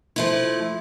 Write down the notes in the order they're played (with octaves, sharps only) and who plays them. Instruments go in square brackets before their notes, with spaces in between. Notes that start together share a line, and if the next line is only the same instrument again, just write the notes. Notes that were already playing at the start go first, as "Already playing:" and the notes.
[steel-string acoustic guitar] F3 A3 E4